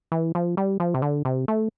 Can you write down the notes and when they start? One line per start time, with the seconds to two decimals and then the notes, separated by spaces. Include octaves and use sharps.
0.12 E3
0.35 F3
0.57 G3
0.80 F3
0.94 C3
1.02 D3
1.25 C3
1.48 A3